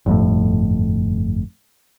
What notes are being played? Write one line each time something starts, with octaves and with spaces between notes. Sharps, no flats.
G1 F2 A2